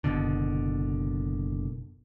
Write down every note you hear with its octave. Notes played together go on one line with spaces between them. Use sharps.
F#1 C2 B2 D3